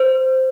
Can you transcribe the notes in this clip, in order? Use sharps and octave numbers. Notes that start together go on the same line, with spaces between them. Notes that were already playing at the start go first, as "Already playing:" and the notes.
Already playing: C5